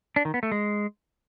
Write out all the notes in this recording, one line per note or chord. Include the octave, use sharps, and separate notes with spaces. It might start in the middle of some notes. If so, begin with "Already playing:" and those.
D4
D#3
B3
A3
G#3